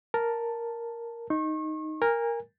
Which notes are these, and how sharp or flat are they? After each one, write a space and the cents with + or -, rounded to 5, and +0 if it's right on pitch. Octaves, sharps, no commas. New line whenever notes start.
A#4 +0 A5 +0
D#4 +0 C#6 -40
A#4 +0 G#5 -30